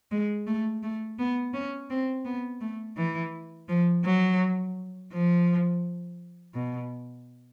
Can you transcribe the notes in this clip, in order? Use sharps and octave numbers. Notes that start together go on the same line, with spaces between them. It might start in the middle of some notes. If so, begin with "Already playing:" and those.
G#3
A3
A3
B3
C#4
C4
B3
A3
E3
F3
F#3
F3
B2